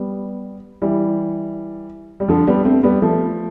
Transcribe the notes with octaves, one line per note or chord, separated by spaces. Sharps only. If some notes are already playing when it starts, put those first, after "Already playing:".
Already playing: G3 B3
E3 G3
G3
D3 F3
G3 B3
A3 C4
G3 B3
F3 A3